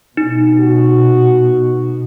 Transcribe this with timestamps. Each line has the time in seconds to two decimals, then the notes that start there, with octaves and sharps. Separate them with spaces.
0.17 B2 D#4
0.60 F#4